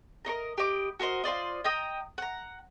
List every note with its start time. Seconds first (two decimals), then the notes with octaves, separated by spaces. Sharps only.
0.25 A#4 C#5 D#5 A#5
0.58 G4 B4 D#5 D6
1.00 F#4 A#4 C5 D#5
1.24 F4 C5 D5 D#5
1.64 D#5 G5 A#5 D#6
2.18 F#5 A#5